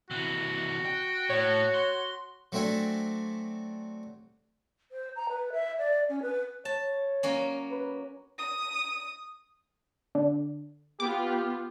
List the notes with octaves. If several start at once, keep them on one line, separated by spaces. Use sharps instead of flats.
C3 E3 F#4
G5
A2 C#5
C6
F#3 A3 C4 D4 E5 G#5
C5
A#5
B4
E5
D5
C#4
B4
C#5 A5
F#3 A#3 C#4
B4
D#6
D3
B3 F4 G4 D6